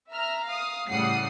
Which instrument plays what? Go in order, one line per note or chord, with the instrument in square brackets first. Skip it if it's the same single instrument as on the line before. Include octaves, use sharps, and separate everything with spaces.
[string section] E5 A#5 F6
F5 D#6
A2 C#3 G3 F#5 D#6 C7